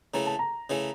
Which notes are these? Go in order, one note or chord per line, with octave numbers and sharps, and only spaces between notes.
C#3 E3 A3 A#5
A5
A#5
C#3 E3 A3